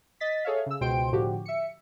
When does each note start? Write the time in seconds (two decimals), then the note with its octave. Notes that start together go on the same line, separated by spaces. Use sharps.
0.20 D#5 A6 B6
0.45 G#4 A4 C#5 E5 F5
0.66 C#3 E6
0.81 C#2 B2 C5 G5 C6 D7
1.12 A2 D3 F3 F#4 G4
1.46 E5 C#7